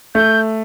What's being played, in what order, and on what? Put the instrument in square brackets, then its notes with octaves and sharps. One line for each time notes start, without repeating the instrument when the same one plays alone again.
[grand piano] A3 [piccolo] G6